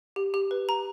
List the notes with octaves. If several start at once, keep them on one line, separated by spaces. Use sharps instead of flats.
G4
G4
B4
A#5